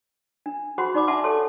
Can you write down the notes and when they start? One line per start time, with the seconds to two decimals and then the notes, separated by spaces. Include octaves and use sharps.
0.46 D4
0.78 F#4 G#4 C5 F#5 B5 C6
0.94 D#4 D5 B5 D6
1.07 D4 E5 F#5 A5 C6 D6
1.24 G4 A4 C#5 A5 C6